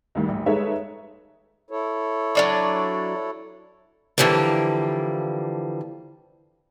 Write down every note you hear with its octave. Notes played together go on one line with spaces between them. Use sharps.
D2 G2 D#3
A#1
G#3 D#4 A4 B4 C#5 E5
E4 A4 C#5
F#3 D4 D5
D3 E3 F3 G3 A#3